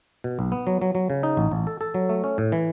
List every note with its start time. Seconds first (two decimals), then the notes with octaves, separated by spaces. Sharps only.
0.24 B2
0.39 B1
0.52 B3
0.67 F#3
0.82 F#3
0.95 F#3
1.10 C#3
1.23 D#4
1.37 A1
1.51 A1
1.67 A4
1.81 A4
1.94 F#3
2.09 A3
2.24 C#4
2.38 A2
2.52 E3